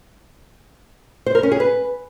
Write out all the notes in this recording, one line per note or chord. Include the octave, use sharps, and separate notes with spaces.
C5
A#4
C#4
G#4
B4